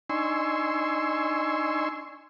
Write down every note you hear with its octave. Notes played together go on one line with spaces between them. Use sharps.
D4 D#4 G#5 C6 C#6 E6